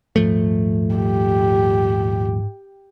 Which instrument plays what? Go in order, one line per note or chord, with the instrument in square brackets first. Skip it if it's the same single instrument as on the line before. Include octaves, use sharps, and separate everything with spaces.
[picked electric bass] D#1 F3 A3 [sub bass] G#2
[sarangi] G4